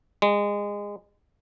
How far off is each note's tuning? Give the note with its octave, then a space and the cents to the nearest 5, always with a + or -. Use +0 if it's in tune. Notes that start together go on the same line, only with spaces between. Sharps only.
G#3 -25